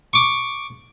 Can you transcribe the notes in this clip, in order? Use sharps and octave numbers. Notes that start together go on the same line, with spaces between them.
C#6 D6